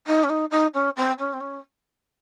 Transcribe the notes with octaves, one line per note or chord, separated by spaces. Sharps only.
D#4
C#4
D#4
D#4
C#4
C4
C#4
C4
C#4